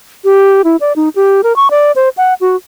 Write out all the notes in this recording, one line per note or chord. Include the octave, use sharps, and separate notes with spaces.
G4
E4
D5
D#4
G4
A#4
C#6
D5
C5
F#5
F#4